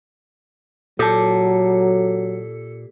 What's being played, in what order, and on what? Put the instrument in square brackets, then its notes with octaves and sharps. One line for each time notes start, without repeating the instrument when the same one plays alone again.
[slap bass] A#2 [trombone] F#3 [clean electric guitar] G4 A5 [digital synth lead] A4